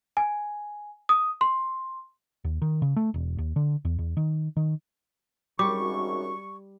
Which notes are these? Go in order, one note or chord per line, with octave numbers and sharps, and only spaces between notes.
G#5
D#6
C6
D#2
D#3
C#3
A3
E1
D#2
D3
E2
E2
D#3
D#3
G#1 F#2 G3 C#6 D6